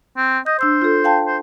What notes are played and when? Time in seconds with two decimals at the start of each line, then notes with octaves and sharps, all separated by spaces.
0.17 C4
0.46 D#5 G6
0.59 D4 C5 E6 G6
0.82 F4 A4
1.04 F5 G5 A5
1.27 C5